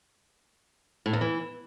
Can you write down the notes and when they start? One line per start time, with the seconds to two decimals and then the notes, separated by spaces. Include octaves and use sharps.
1.06 A2
1.13 E2
1.21 E3